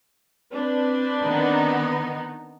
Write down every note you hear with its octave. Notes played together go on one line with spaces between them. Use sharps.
C4 D4 B4
D#3 B3 D#4